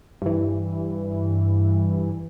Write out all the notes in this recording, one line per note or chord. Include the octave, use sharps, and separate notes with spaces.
G2 E3